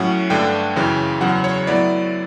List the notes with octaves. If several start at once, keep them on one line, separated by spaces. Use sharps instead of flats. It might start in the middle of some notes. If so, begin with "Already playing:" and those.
Already playing: A2 F#3 C#4 F#5
G2 D3 A3 D4 G5
F#2 C#3 E3
E2 C#3 F#3 F#5
C#5
A2 F#3 B3 E4 D5